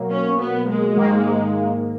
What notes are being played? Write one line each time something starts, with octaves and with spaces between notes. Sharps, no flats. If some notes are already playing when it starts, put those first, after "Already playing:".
Already playing: B2 F#3 A#3
C#4
B3
G#3
G#2 D#3 A#3